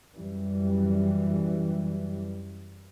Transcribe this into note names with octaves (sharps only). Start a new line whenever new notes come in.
F#2 E3 G3